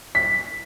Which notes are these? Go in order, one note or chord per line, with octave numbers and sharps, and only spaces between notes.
B6